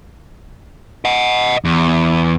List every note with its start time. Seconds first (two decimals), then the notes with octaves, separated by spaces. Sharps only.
1.05 D#5 F#5
1.65 E2